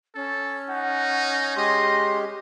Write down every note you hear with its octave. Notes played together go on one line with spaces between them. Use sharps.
C#4 A4
D#4 F#5
G#3 G4 D#5 C6